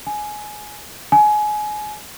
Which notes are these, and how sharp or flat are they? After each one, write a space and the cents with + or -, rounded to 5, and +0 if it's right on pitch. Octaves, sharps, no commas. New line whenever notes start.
G#5 +15
G#5 +25